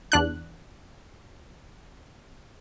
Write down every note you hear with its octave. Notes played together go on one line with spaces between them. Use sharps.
E2 D4 F#6